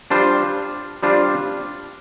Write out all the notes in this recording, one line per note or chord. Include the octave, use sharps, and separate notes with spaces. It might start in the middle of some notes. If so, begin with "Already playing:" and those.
G3 D4 F4 C5
G3 D4 F4 C5